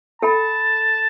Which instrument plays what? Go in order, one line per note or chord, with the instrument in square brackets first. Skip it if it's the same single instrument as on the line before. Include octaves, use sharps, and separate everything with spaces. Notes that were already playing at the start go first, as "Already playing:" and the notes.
[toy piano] A4 G5 B5 [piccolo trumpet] A5